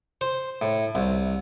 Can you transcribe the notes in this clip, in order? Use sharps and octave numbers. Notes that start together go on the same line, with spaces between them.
C5
A2
C2